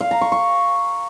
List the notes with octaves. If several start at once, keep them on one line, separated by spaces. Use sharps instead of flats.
F5
A#5
C#6
C#6